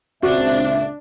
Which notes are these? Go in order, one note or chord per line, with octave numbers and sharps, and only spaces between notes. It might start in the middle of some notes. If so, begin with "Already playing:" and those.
C#2 A#2 C4 D4 F#4 C5 E5